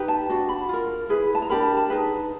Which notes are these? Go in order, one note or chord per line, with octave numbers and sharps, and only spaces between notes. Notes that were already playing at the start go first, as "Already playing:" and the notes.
Already playing: D#4 G4 B4
A5
D4 F#4
B5
F4 A#4
E4 G#4 B4
A5
A#5
D4 G4 A#4 B5
A5
A5
D#4 G#4 B4